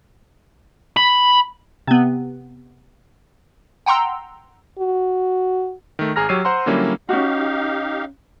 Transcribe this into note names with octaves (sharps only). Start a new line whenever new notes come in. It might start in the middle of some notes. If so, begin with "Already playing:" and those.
B5
C3 B3
F#5 G5 A#5 C6 E6
F#4
D#3 A3
G#1 G#4 A#5 F6 A#6
F#3 G4 C#5 E6 C7 D#7
C5 F#5 A#5 C6
D3 F#3 G3 A#3 C#4 E4
C#4 D#4 F#4 G4 F5